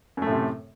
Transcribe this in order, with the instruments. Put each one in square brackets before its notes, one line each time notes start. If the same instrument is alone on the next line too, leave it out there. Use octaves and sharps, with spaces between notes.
[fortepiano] F#2
A3
A2
C3